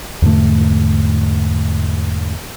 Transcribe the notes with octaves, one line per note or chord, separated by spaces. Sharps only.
E2 G#2 D3 A3